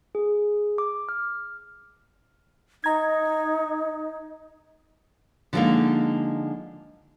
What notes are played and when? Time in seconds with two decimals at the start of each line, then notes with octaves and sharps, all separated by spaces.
0.15 G#4
0.78 D6
1.09 F6
2.84 D#4 A#5 G#6
5.53 D3 F3 G3 G#3 A#3 D#4